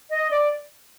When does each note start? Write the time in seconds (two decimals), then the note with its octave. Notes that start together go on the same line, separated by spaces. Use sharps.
0.10 D#5
0.31 D5